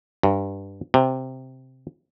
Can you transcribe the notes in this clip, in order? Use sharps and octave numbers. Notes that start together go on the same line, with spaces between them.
G2
C3